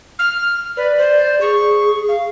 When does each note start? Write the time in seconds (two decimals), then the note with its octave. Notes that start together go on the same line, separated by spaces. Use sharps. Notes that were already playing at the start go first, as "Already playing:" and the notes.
0.19 F6
0.77 B4 D5
0.98 C5
1.41 G#4 C#6
2.09 F5